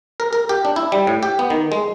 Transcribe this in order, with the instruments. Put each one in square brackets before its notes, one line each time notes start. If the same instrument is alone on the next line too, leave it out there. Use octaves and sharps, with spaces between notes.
[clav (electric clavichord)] A#4
A#4
G4
D4
E4
G3
A2
G4
B3
D#3
G#3